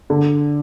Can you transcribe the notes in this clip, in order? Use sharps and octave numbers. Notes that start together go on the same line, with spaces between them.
D3